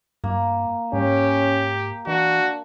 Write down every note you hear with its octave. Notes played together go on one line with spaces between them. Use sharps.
G2 A#3
G#2 C#4 G4
E3 D4 F#4